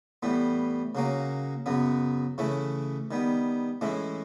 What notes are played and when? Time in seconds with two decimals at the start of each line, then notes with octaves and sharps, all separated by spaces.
0.23 A2 E3 G3 B3
0.95 C#3 F#3 A#3 C#4
1.66 F#2 C#3 F#3 B3
2.38 C#3 E3 A3 C#4 E4
3.11 D#3 G3 B3
3.81 A2 E3 G#3 C#4 E4